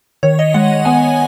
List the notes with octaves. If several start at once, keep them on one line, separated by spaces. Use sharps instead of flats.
D#3 C#5
D#5
G#3 F#5
B3 G#5